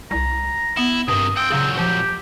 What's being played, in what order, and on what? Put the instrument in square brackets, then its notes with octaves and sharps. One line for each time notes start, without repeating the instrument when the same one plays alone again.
[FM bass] C2 [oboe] A#5
[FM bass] B3 [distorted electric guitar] E4
[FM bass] G2 [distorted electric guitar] C3 D#3 [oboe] D#6
[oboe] C4 [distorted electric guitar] F#5 G5
[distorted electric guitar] A#2 F#3 [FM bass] C#3
[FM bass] F3 [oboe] G4